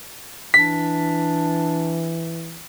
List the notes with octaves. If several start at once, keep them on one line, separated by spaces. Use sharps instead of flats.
E3 D4 B6